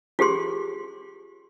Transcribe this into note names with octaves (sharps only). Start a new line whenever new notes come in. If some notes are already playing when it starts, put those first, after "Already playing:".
F4 G4 G#4 C6